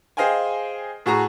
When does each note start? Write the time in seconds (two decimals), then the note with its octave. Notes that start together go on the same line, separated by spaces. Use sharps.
0.17 G#4 C5 D#5 F5 G5 G#5
1.06 A2 F#4 G#4 A#5